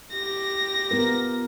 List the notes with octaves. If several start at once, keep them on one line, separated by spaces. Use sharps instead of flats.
G4 A#6
B3 F4 A#4